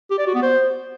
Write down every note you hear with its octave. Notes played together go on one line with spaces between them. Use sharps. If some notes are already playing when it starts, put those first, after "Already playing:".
G4
D5
F#4
B3
C5